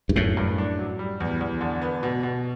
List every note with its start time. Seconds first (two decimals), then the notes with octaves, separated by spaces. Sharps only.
0.09 G2
0.16 F#2 A2 A3
0.37 G2
0.58 D4
0.79 F#3
0.99 G3
1.20 E2
1.41 E2
1.61 D3
1.82 B3
2.03 B2
2.23 B2